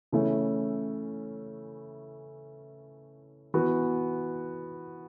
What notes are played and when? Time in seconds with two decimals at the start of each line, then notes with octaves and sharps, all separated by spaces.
0.12 C#3 E3 A3 C#4 E4
3.54 E3 B3 F#4